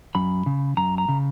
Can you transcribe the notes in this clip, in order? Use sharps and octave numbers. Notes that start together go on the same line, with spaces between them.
F#2 B5
C#3
F#2 A#5
A#5
C#3